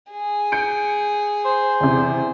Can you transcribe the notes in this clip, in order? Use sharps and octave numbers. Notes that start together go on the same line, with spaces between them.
G#4
G6 C#7 D7
C5
E2 C3